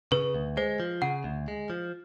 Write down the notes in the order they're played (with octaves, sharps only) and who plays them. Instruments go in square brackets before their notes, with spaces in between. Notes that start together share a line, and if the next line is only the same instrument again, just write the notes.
[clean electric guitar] C#3 [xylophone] B4
[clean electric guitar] D2
[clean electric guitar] G#3 [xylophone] C5
[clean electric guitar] F3
[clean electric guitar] C#3 [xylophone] F#5
[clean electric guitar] D2
G#3
F3